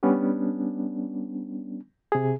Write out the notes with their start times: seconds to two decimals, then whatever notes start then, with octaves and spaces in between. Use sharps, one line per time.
0.03 G3 B3 C#4 D4
2.12 C3 G#4